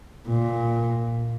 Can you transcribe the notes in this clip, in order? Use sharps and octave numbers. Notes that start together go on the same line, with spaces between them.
A#2